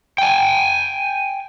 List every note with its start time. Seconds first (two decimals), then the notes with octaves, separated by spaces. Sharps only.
0.18 G5 G#5